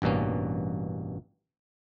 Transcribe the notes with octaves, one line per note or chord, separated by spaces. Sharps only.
A1 G2 B2 A#3 C#4